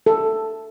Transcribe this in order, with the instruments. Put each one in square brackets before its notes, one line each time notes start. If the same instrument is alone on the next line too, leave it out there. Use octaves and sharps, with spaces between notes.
[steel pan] A4